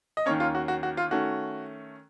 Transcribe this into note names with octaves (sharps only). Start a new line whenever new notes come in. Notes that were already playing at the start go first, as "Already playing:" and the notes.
D#5
D#2 D#3 A#3 C#4 C#5
F4
F#4
F#4
F#4
F4
D#3 A3 C#4 F#4